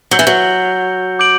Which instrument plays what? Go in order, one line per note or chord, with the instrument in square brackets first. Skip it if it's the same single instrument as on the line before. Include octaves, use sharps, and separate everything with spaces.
[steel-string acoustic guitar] F#3 [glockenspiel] E6 G6 C#7 G7
[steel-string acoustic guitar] E3
F#3
[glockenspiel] D6 G6 D7 F#7